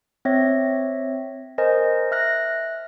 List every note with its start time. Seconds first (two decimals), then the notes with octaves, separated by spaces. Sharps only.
0.25 C4 C#5 E5 A#6
1.58 A#4 C5 D#5 G#5
2.11 E5 F6 F#6 A#6